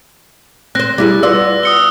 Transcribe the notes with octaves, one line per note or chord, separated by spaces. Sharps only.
C4 C5 F#6 A#6
G3 E4 G#4
B3 F4 D5 E6
D#6 C#7 G7